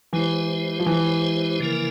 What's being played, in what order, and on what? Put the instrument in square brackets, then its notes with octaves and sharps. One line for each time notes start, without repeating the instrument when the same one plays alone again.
[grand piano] E3 [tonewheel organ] G#3 E4 G4 C5
[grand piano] F3
E3
[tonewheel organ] C#3 F3 A#3 E4 A#4